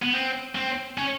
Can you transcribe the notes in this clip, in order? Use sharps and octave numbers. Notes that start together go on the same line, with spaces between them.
B3
C4
C4
C#4